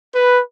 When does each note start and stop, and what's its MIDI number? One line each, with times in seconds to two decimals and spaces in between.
0.15 0.42 71